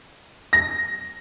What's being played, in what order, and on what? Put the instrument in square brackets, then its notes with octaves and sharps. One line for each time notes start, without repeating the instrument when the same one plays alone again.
[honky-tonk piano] A#6